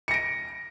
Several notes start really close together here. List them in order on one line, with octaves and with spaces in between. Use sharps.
C#7 A#6 D7